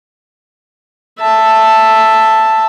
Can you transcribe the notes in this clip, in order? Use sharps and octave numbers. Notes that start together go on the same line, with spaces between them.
E5 A5